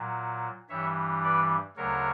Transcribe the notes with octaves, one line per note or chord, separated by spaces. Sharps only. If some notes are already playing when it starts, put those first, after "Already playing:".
Already playing: A#2 F#3
G2 E3 G3 C#5 E5
B4 D5
D2 C#3 F#3 A#4 C#5